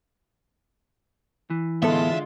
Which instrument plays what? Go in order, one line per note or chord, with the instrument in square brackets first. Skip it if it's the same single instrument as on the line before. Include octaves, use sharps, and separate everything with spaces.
[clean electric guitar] E3
[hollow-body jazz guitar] A2 B3 A4 [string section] D3 G#3 F4 [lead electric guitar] E5